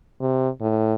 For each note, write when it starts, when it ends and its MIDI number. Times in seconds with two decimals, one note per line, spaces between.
0.20 0.49 48
0.61 0.95 45